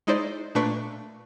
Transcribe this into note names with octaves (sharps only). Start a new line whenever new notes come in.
G#3 D#4 E4 C5 D5
A#2 A3 D4 B4 C#6